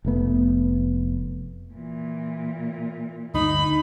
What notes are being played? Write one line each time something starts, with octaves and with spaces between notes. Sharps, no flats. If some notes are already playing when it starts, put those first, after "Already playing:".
F1 A3 B3
A#2 E3
D2 G2 D3 D#4 B5